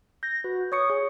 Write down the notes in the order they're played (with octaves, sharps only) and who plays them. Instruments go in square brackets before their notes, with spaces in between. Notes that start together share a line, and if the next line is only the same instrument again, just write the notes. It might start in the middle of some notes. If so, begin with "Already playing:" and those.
[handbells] G6 [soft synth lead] A#6
[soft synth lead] F#4 [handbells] B4
[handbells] C#5 C#6 C#7 [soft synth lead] D#6
[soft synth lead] G#4 [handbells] C#5